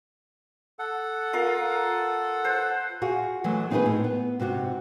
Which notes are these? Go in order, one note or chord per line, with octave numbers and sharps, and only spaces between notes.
A4 F#5
F4 A#4 F5
B4 C5
F4 F#4 G#4
E3 F#3 G#3 A3
C4 D#4 E4 F#4 G#4 B4
A2
B3
G#2 C3 F#4 G4